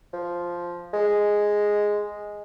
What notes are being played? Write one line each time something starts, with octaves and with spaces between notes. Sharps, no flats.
F3
G#3